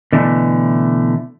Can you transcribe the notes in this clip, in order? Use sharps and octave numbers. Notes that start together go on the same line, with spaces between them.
B2 D3 E3 A3